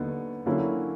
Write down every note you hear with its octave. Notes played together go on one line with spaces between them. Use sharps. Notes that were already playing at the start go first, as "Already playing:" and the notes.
Already playing: D#2 D3 F#3 B3 D#4
D3 F#3 A#3 C#4 E4